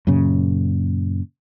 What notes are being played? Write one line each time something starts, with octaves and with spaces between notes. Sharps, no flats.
F#2 A#2 C#3